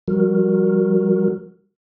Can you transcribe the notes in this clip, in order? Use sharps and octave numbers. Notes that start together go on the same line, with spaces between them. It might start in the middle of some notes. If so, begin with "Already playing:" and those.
F3 G3 F#4 A#4